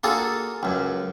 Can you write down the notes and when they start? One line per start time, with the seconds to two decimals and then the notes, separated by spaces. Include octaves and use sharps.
0.04 A#3 D4 F4 F#4 G#4 A4
0.63 C#2 F#2